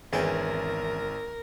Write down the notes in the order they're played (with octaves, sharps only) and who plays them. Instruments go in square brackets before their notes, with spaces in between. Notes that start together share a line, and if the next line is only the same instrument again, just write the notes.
[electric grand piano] G#1 [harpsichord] E2 C#4 G5 [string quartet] A#4